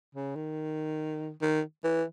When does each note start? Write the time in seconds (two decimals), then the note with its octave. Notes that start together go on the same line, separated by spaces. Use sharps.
0.15 C#3
0.36 D#3
1.42 D#3
1.84 E3